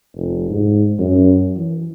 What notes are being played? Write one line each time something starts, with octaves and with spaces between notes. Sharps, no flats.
F1
G#2
F#2
E3